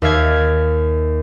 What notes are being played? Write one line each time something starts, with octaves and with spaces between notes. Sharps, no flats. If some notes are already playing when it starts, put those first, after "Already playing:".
D#2 E5 F5 G#6